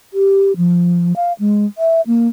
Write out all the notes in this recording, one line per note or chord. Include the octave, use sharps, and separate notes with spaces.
G4
F3
F5
G#3
E5
A#3